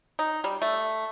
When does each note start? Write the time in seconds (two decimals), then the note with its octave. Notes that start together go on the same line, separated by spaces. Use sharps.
0.19 D#4
0.44 G3
0.62 A3